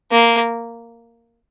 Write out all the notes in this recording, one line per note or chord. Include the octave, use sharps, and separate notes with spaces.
A#3